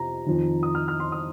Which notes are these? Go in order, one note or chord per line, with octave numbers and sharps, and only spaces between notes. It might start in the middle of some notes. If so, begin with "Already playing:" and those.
Already playing: F2 C3 A#5
F2 D#3
D#6
F6
F6
C6
D#6